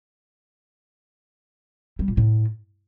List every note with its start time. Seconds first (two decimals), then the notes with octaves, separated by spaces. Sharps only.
1.99 G3
2.08 A#2
2.17 A2